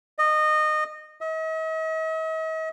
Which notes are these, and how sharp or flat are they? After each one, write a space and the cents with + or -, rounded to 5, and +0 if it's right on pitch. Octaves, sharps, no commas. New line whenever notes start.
D#5 -20
D#5 +45